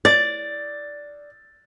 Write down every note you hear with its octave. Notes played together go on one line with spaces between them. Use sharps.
D5 A6